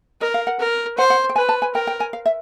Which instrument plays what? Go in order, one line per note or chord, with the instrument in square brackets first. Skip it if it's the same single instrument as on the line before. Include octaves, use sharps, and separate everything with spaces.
[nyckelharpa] A#4 [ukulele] D#5
[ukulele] F5
F#5
[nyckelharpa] A#4
[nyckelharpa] C5 [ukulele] F#5
[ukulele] F#5
G5
[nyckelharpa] B4 [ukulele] G#5
[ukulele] A5
G#5
[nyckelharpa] A#4 [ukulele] G5
[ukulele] G5
G#5
F5
E5